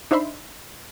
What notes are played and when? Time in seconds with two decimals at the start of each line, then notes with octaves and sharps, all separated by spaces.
0.11 D4 D#4 C5 E5 B5 C6